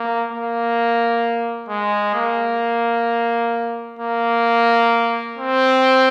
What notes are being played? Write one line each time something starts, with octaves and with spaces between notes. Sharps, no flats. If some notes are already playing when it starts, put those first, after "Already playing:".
Already playing: A#3
A#3
G#3
A#3
A#3
C4